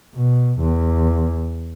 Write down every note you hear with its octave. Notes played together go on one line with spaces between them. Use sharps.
B2
E2